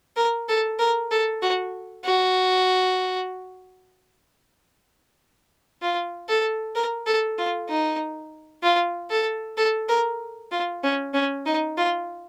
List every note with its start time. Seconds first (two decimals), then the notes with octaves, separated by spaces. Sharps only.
0.17 A#4
0.49 A4
0.79 A#4
1.11 A4
1.42 F#4
2.05 F#4
5.82 F4
6.29 A4
6.75 A#4
7.06 A4
7.38 F4
7.69 D#4
8.63 F4
9.10 A4
9.57 A4
9.89 A#4
10.52 F4
10.83 C#4
11.14 C#4
11.46 D#4
11.77 F4